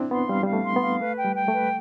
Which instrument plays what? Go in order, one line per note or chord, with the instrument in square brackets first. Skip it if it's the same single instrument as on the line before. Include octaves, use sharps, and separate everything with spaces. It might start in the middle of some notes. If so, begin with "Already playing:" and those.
Already playing: [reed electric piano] C4 D4 E4
[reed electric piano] B3 [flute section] C6
[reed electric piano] G3 [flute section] F5
[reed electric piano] G3
[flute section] F5
[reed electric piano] A3
[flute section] C6
[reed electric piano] B3
[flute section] F5
[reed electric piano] A3 [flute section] B4
[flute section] G5
[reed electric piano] G3
[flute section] G5
[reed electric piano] A3
[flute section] B4